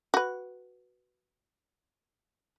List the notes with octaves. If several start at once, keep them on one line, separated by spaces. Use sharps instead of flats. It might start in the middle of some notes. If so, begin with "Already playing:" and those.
F#4 B4